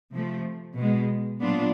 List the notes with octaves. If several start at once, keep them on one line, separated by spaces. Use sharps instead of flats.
C3 F3 A3
B2 G#3 B3
A#2 F#3 B3 D4 F4